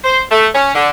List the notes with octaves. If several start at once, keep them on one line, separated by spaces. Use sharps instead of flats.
C5
A3
C#4
D3